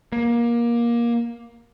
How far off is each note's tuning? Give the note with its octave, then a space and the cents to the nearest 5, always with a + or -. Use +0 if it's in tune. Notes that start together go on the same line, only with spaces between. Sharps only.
A#3 +20